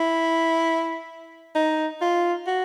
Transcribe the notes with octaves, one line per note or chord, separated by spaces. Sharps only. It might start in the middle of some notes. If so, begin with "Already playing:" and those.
Already playing: E4
D#4
F4
F#4